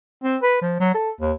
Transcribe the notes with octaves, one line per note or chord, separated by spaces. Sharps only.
C4
B4
F3
F#3
A4
D#2